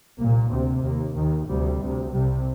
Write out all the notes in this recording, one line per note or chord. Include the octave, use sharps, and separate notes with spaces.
C2 A#2 A#3
D2 C3 C4
D#2 A#3
D#2 D#3
D2 C3 G3
D2 C3
C2 C3 G3